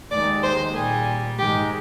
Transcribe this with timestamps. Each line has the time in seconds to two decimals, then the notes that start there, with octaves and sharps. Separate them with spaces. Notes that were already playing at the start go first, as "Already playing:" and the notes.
0.11 D#2 D#3 G#3 D5
0.43 C5
0.74 A#2 G3 G#4
1.38 G#2 D#3 G#3 G4